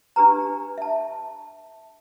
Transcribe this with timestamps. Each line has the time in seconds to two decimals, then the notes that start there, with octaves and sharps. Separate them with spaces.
0.16 D4 G4 B4 A#5
0.78 E5 A5